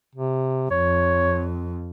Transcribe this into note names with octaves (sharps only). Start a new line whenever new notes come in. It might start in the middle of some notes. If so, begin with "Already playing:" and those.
C3
F2 C#5